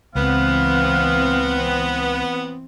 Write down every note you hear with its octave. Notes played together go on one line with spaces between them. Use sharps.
C#2 E3 B3 C4 F5